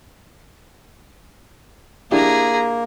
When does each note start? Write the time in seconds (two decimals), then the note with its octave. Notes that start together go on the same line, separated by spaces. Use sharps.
2.11 A#3 D4 E4 G4 G#4 A#5